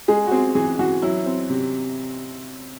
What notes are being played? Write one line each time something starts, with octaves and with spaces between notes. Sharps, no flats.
G#3 G#4
F#4
C4 G#4
E3 G#4
E3 F#4
F#3 E4
C4
C3